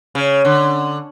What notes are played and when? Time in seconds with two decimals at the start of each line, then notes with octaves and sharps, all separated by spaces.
0.15 C#3
0.45 D3